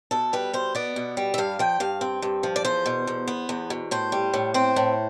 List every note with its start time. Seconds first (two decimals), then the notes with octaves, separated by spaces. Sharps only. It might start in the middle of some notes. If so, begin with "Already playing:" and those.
0.11 B2 A4
0.33 G3 B4
0.53 B2 C5
0.75 B3 D5
0.96 B2
1.17 G3
1.34 E5
1.38 G2 F5
1.59 F3 G5
1.80 G2 F5
2.01 C4
2.22 G2
2.43 F3
2.56 D5
2.65 E2 C5
2.86 B2
3.07 E2
3.27 B3
3.49 E2
3.70 B2
3.91 A2 C5
4.12 G3
4.34 A2
4.54 C4 C5
4.76 A2